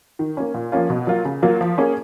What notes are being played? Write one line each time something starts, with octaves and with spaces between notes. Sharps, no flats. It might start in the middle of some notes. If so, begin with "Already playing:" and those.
D#3
A#3 C#4
A#2
F3 A#3 C#4 F4
B2
F#3 A#3 F4
C#3
F#3 A#3 F4
F3
A#3 C#4 G#4